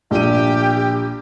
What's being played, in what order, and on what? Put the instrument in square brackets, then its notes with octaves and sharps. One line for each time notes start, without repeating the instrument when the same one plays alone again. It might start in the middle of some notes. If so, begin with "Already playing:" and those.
[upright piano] A#1 D#7 [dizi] G4